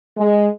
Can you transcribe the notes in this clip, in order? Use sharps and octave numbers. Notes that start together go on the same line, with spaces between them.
G#3